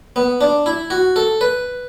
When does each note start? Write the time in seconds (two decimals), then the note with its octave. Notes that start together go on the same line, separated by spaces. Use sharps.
0.16 B3
0.41 D4
0.66 E4
0.90 F#4
1.16 A4
1.41 B4